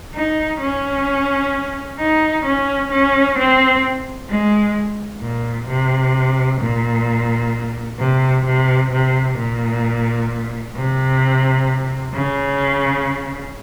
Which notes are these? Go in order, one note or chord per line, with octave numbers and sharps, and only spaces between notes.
D#4
C#4
D#4
C#4
C#4
C4
G#3
A#2
C3
A#2
C3
C3
C3
A#2
C3
C#3